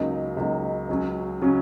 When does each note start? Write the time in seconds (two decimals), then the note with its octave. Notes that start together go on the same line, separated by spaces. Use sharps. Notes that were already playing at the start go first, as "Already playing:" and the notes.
Already playing: C#2 C#3 F#3 A#3 D#4
0.37 C#2 C#3 F#3 A#3 D#4
0.89 C#2 C#3 F#3 C#4
1.42 C#3 F#3 C#4